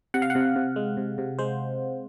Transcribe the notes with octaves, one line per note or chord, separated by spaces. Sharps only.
C3 F#5
F5
F#5
C3
C3
G#3
C3
C3
G#3 C5